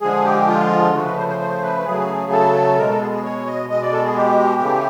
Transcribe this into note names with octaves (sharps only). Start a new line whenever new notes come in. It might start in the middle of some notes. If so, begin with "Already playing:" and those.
D3 F3 G#3 G#4
G4
F4
C#3 F3 A3 F#4
B4
C5
C5
C5
B4
C#3 F#3 A3 G#4
A4
B2 G#3 A#4
A4
G#4
G#4
C#5
D#5
B2 G#3 D#5
D5
A4
G#4
G4
C#3 E3 A3